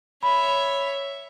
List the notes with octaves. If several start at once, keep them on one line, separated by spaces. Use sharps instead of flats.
C#5 E5 B5